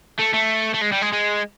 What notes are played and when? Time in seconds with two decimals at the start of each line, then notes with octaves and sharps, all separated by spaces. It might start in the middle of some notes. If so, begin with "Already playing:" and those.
0.19 A3
0.34 A3
0.74 A3
0.82 G#3
0.92 G3
1.02 G#3
1.13 G#3